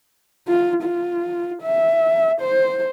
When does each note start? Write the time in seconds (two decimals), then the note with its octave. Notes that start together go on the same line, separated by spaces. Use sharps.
0.48 F4
0.83 F4
1.63 E5
2.40 C5